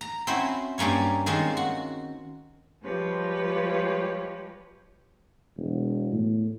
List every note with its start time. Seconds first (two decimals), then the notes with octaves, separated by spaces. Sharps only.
0.01 A#5
0.27 C4 C#4 E4 F#4 C5
0.78 G2 G3 A#3 C#4 C#5
1.26 D#3 G#3 C4 C#4 F4
1.57 F#4
2.83 F3 G3 G#3 G4 B4 C#5
5.57 E1
6.12 A2